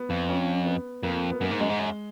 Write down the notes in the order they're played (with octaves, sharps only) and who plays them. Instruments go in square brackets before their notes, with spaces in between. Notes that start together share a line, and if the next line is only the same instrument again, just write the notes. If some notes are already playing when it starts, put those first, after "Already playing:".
Already playing: [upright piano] B3
[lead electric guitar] F2
[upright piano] C#4
B3
[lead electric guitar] F2 [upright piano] A#3
[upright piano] B3
[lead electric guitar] F#2 [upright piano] A#3
[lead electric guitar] G#2
[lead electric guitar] F#2 [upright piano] G#3
[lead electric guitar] G#2
F#2